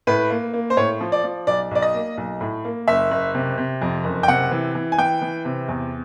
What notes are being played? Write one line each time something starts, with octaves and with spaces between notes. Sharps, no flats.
A2 B4
A#3
A#3
C5
A2 C#5
F3
D5
F3
B1 D5
B1 D5
D#5
A#3
B1
A2
A#3
F#1 E5
F#1
C3
C3
F2
F#1
G5
C3 F#5
E3
E3
G#5
E3 G5
E3
C3
E2